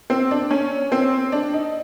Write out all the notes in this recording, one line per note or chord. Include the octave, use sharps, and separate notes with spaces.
C4
D4
C#4
C4
D4
D#4